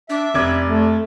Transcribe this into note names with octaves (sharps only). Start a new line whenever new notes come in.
D4 E5
F1 D5 D6 G#6
A3